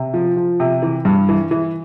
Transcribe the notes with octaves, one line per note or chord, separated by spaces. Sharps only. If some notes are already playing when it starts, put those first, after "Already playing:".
Already playing: C3
F3
F3
C3
E3
G2
E3
E3